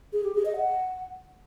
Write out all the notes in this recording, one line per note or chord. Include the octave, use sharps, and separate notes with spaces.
G#4
G4
G#4
D#5
F#5